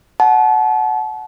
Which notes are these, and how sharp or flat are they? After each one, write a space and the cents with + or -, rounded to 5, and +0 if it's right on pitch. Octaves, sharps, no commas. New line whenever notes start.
F#5 +0 A5 -35